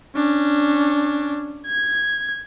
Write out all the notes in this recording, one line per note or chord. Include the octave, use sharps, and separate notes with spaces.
C#4 D4
G#6